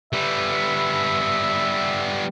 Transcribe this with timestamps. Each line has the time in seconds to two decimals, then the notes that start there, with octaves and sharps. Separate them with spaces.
0.13 G3 B3 E5